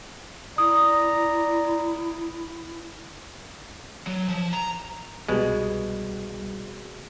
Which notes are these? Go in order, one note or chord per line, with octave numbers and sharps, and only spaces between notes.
E4 D5 A#5 D#6
F#3
F3
A#5
C2 B2 G3 G#3